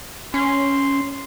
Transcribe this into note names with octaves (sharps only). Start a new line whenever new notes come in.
C#4 C6